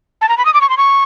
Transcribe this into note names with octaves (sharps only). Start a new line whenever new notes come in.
A5
A#5
B5
D#6
D6
C#6
C6
C#6